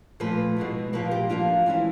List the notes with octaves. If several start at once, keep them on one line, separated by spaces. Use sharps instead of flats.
A#2 F3 A3 B4
B2 G#3 B3 E4
A#2 F3 A#3 B4
G4
F3 A#3 D4 F4
E3 G#3 C#4 E4